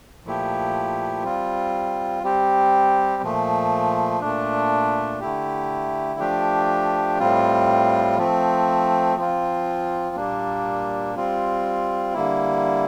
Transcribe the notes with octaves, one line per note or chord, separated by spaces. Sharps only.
A#2 F3 A3 E4 G4
G3 C4 F4
G3 C4 G4
A#2 F3 A3
A#2 A3 D4
D3 A3 E4 G4
F3 A3 D4 G4
A2 G3 C4 F4
F3 A3 C4
F3 C4 F4
A#2 G3 A#3 D4
G3 C4 F4
D3 G3 A#3 E4